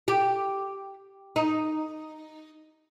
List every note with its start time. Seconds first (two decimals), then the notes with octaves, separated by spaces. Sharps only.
0.08 G4
1.36 D#4